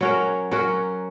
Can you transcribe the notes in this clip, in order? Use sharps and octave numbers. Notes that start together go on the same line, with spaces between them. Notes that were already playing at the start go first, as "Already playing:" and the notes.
F#3 C#4 F#4 A#4
F#3 C#4 F#4 A#4